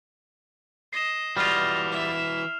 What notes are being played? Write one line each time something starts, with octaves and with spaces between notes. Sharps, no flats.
D#5 C7 E7
E3 G3 F4 F#4 D#5 F6 F7
E4 E5